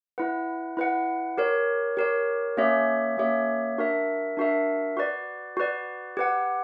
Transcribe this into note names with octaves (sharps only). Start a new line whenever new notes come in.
E4 B4 F#5
E4 B4 F#5
G4 A#4 C#5
G4 A#4 C#5
A#3 C#4 G4 C#5 E5
A#3 C#4 G4 C#5 E5
D4 F#4 A#4 E5
D4 F#4 A#4 E5
F#4 B4 D5
F#4 B4 D5
G4 B4 F#5